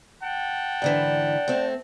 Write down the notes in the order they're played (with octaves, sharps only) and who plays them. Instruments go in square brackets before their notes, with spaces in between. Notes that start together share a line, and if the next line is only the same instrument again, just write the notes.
[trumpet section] F#5 G5 A5
[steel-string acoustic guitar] G#2 D3 E3 [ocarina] D5
[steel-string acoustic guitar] A3 C4